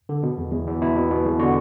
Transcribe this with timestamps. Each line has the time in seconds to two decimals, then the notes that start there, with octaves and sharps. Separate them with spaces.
0.09 D3
0.23 B2
0.38 E2
0.52 E2
0.67 E2
0.81 B2 E4
0.96 B2
1.11 B2
1.25 E2
1.40 D3 F#4